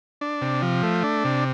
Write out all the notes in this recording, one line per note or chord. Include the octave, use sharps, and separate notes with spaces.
D4
C3
F3
A3
D4
C3